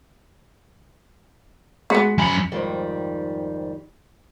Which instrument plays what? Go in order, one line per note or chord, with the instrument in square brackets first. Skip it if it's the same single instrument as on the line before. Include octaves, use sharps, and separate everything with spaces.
[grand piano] G#3 B6 C#7 [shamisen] B3 F#4
[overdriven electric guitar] F#2 B5 [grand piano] G#5 C#7
[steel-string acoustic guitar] F2 G#2 D#3 G3